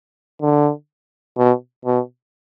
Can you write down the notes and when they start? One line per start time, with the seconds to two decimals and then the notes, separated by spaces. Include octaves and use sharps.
0.42 D3
1.37 B2
1.85 B2